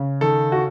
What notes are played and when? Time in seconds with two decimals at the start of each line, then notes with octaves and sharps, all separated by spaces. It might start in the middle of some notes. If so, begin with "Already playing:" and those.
Already playing: C#3
0.21 D#3 A4
0.52 F#4